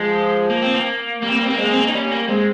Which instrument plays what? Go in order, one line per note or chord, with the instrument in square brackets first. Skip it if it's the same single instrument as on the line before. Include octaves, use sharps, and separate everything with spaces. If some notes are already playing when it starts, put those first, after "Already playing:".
Already playing: [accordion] F3 [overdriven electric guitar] G#3
[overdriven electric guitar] A#3
C4
A#3
[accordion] G3 [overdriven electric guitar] A#3
[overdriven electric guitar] C4
A#3
C4
A#3
[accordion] G#3 [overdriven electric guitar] C4
[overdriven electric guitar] A#3
C4
A#3
D#4
[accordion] G3 [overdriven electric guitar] C#4
[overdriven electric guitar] A#3
[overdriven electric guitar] G#3 [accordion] C4